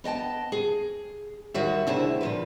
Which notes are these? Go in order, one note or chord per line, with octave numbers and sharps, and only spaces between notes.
B3 D#5 G5 A5
G#4
D#2 D#3 G3 F#4 C#5 E5
D2 C3 E4 G#4 E5
A#2 F3 B4